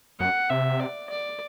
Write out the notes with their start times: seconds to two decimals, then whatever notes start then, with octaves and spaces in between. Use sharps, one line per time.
0.20 F#2 F#5
0.49 C3 E5
0.80 D5
1.09 D5